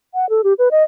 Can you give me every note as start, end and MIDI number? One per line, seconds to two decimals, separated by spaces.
0.14 0.29 78
0.30 0.42 69
0.44 0.53 67
0.59 0.69 71
0.71 0.83 75